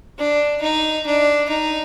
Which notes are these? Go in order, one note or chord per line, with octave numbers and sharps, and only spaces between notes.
D4
D#4
D4
D#4